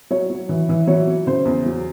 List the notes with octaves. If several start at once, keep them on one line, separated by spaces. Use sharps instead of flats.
F#3 C#5
F#3
E3
E3
F#3 C#5
F#3
C#3 C5
E2
F#3